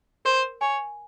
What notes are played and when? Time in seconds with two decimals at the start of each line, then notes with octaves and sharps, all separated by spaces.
0.25 A#4 C5
0.61 C#5 G#5